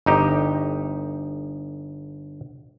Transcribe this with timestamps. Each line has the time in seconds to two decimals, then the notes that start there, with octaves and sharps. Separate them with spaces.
0.06 G1 D#4 G4